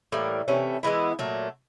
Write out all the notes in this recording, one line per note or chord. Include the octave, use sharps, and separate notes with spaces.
A2 E3 G3 A#3
C3 E3 A3 C#4
E3 G#3 B3 E4
A#2 F#3 A3